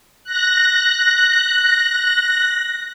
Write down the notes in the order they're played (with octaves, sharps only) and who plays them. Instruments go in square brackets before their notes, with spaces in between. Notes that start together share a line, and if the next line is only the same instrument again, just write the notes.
[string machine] F#6 A#6